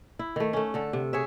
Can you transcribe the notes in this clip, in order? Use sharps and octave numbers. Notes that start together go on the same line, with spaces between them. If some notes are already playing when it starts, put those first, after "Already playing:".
E4
D#3 A3
A3 C#4
D3 A4
C3
G#4 C#5 E5